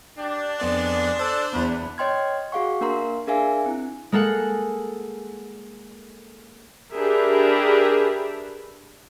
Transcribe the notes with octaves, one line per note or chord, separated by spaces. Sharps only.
D4 G4
F2 G#3 B3 D5
A4 C5
E2 B4
C#5 D#5 G5 C6 F6 G#6
F#4 G#4 F5 F#5 C#6
A#3 D4 A#4 F5 A#5 C6
D4 G#4 A#4 E5 F5 G#5
C4 E4
G#3 A#3 A4 F#5
D4 G4 G#4 A#4 B4 E5